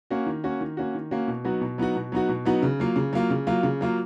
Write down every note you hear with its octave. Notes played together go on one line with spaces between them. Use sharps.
A#3 C#4 F#4
D#3
A#3 C#4 F#4
D#3
A#3 C#4 F#4
D#3
A#3 C#4 F#4
B2
F#3 B3 D#4 F#4
B2
F#3 B3 D#4 F#4
B2
F#3 B3 D#4 F#4
B2
F#3 B3 D#4 F#4
C#3
F#3 A#3 F4
C#3
F#3 A#3 F4
C#3
F#3 A#3 F4
C#3
F#3 A#3 F4